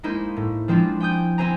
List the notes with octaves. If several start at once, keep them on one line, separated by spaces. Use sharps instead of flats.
G#3 A#3 D#4 E4 C5
A2
F3 G#3 C4 D4 E4 F4
G5 G#5 D#6 G6
C4 E4 C5 G#5 A#5